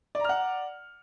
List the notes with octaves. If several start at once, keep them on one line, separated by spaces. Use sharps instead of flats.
D5 F#5 A#5 F6